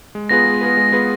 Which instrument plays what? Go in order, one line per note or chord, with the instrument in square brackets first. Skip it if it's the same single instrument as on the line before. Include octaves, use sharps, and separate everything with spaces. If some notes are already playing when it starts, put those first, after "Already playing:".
[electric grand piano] G#3
[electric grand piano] B3 F4 G#4 B4 [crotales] A#6
[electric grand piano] G#3
B3 F4 G#4 B4
G#3
B3 F4 G#4 B4